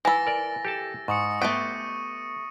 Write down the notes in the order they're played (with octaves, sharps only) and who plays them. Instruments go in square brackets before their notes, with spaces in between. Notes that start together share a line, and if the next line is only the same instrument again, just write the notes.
[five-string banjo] E3 B5 [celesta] G#5 [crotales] E6 A6 A#6
[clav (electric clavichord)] A#4 D5
G4 A4 A5
[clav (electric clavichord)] G#2 [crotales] C#6 D#6 C#7
[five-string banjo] A3 G4 G5 [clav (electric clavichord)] B3 [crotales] D#7